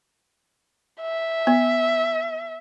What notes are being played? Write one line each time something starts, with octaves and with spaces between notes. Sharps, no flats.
E5
B3